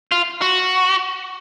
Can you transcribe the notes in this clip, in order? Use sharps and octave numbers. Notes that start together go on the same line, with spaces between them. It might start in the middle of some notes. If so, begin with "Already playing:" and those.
F4
F#4